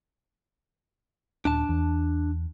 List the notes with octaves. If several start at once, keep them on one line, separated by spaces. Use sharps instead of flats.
D#1 D4 A5
E2